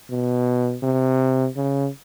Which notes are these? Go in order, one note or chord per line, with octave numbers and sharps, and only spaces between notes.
B2
C3
C#3